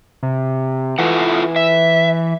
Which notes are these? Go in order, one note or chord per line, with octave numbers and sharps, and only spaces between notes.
C3
E3 F4 A4 F#5
E5